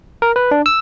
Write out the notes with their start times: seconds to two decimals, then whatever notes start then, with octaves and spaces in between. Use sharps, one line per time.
0.22 A#4
0.36 B4
0.51 D4
0.66 E6